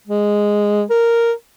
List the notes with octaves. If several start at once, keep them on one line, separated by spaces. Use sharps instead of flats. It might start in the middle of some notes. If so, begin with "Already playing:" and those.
G#3
A#4